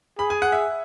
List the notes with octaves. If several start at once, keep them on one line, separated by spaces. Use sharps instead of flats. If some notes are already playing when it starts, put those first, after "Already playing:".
G#4 B5
G#5
F#5
E5